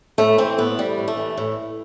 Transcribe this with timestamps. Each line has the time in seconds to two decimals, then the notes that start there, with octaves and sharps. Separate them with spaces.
0.18 A2 A3
0.38 E3 C4
0.58 A2 B3
0.78 E3 G3
0.98 A2
1.08 A3
1.17 E3
1.37 A2